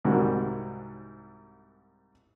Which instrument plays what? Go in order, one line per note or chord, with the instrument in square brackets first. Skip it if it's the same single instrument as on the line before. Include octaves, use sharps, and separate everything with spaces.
[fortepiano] C2 G#2 D#3 G3 F#4